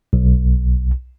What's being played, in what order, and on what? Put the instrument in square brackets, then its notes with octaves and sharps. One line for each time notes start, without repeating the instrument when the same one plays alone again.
[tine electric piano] B1